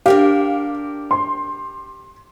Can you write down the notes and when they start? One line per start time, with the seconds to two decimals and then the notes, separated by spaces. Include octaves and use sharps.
0.06 D4 G4 A#4 F5 G5
1.11 C6